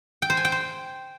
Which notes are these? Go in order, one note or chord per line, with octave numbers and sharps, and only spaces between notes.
G5
C5
G#5
G5
C5